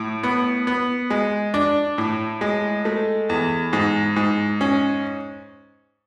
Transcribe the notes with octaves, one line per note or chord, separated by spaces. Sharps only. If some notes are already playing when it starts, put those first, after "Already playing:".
Already playing: A2
B3
B3
G#3
D4
A2
G#3
A3
E2
G#2
G#2
C#4